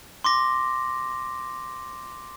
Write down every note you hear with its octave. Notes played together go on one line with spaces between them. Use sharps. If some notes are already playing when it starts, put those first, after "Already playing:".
C6 D6 A#6